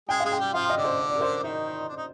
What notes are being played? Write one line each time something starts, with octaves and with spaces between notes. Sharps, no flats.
G#3 G#4 G5
G#3 G#4 F5
G5
G3 G4
F3 F4 F5
D#5
D3 D4
C5
D5
D5
A#4
C5
D#3 D#4 D#5
D4
D#4